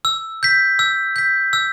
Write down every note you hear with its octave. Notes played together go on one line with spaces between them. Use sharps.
E6
G6 B6
E6
G6 B6
E6